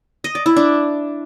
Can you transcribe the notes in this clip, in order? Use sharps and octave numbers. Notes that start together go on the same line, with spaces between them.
D#5
D5
E4
D4